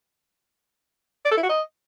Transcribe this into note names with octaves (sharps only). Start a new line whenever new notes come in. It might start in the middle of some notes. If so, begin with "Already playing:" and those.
D5
A4
E4
F#4
D#5